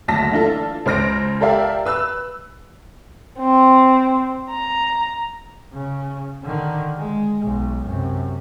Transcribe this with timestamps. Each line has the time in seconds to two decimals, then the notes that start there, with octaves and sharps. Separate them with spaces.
0.08 F#1 D2 A5 A#6 B6
0.32 E3 D4 F4 A4
0.86 C#2 C5 F6 A#6 D7
1.41 G4 A4 A#4 D5 E5 F5
1.85 B4 E6 F#6
3.40 C4
4.51 A#5
5.73 C#3
6.43 D3 D#3
6.97 G#3
7.44 B1
7.86 F#2 C3